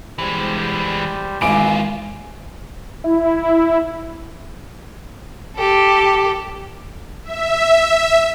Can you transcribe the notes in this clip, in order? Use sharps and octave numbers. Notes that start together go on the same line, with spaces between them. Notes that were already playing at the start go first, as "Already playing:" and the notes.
E3 G3 G#3 C5
G#1 B2 E3 E4 F4 G#5 D6 D7
E4
G4 A4
E5